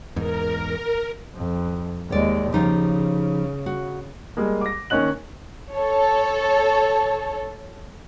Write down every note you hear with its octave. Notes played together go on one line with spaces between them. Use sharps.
E2 G#2 A#4
F2
D#2 G#3 C#5 D5
C#3 F3 D#4 G4
F#4
G3 G#3 A#3
D6 A#6
D#3 A#3 C#4 D#5 F#6 F#7
A4 C#5